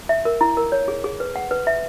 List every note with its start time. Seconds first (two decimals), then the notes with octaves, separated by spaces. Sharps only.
0.09 E5
0.25 A#4
0.41 E4
0.57 A#4
0.72 C#5
0.88 G#4
1.04 G#4
1.20 B4
1.36 F#5
1.51 B4
1.67 E5